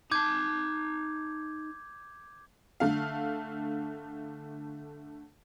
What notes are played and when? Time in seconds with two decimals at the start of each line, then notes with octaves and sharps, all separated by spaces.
0.11 D#4 A5 D6 G6 G#6
2.80 D3 A3 F5